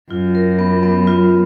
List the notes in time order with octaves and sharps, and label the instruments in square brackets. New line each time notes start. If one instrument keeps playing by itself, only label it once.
[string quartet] F#2 [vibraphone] F4
[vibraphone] A#4
B3
B3
F4